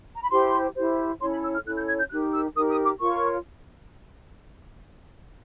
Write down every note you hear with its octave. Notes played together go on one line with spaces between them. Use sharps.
A#5
B5
E4 G4 C5 C6
E4 G4 C5
C#4 E4 A4 C#5 C6
B5
E6
F6
C#4 E4 A4 C#5 F#6
G6
G#6
G6
D#4 G4 A#4 F#6
E6
D#4 G4 A#4 D#6
D#6
D6
F4 A#4 C#5 C#6